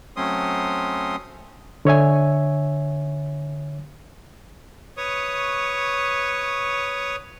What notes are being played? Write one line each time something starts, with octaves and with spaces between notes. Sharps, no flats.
F#3 A3 C4 C#4 C6 D#6
D3 C#5 E5 G#5
B4 C#5 C#6 D#6